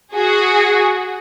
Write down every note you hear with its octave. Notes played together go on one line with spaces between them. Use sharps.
F#4 G#4